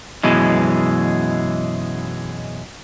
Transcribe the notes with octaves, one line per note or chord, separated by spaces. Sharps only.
F#2 B2 E3 G#3